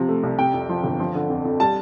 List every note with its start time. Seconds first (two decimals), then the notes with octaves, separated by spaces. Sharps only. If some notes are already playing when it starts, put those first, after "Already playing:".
Already playing: C3 F3
0.09 A3
0.23 C2
0.39 C3 G5
0.54 F2
0.69 F3
0.84 G1
1.00 F3
1.15 D3
1.30 F2
1.45 F2
1.60 G3 A5